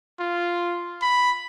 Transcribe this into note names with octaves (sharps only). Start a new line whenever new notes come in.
F4
B5